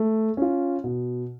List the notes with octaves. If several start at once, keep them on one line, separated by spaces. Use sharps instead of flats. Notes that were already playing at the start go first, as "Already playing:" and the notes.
Already playing: A3
C#4 F4
B2